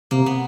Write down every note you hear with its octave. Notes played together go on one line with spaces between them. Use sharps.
C3 A#3
B3